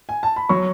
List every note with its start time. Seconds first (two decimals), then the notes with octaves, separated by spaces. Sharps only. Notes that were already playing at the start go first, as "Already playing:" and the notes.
0.09 G#5
0.23 A5
0.36 B5
0.49 F#3 C#6